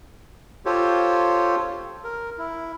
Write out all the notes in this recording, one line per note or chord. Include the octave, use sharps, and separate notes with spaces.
F4 G4 A4 C5 C#5
A#4
E4